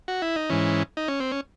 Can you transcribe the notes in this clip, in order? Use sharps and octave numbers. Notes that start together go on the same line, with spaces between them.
F#4
E4
D#4
G#2 E3 C#4
D#4
C#4
C4
C#4